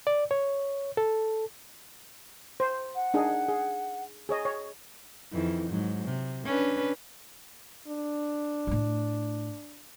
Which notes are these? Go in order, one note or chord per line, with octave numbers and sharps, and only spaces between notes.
D5
C#5
A4
C5
F#5
D4 D#4 G#4
G#4
G#4 C#5 D#5
C#5
F2 D#3 E3
G#2 F#3
C3
C#4 D4 B4
D4
A2 A3